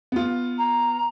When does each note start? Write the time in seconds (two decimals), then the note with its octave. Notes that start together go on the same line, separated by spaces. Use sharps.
0.12 B3 F4
0.58 A#5